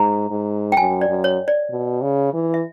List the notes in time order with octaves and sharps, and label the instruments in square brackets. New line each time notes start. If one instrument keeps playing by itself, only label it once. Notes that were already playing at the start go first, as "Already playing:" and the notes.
Already playing: [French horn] G#2 [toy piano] A#5
[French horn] G#2
[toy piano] G5
[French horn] F#2 [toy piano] G#5
[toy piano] D5
[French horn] F#2
[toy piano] C#5
D5
[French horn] B2
C#3
E3
[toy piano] E5